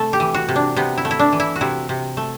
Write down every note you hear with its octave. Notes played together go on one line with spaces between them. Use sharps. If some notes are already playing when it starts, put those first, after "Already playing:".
Already playing: C3 A3 A4
G4
E3
F#4
C3
D4
C3 B3
E4
A3
E4
D4
E3
E4
F#4
C3 E4
C3
A3